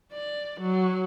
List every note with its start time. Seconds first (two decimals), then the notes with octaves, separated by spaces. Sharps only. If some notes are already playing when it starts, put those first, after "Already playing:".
0.13 D5
0.60 F#3